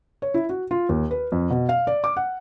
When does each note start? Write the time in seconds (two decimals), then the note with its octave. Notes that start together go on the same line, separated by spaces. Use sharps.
0.22 C#5
0.34 E4
0.49 F#4
0.71 F4
0.89 D#2
1.11 B4
1.32 F2
1.50 B2
1.69 F5
1.87 D5
2.04 D6
2.16 F#5